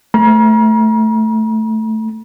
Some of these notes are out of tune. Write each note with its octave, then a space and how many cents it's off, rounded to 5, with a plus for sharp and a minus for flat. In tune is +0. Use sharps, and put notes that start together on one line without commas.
A3 +0 A#5 +40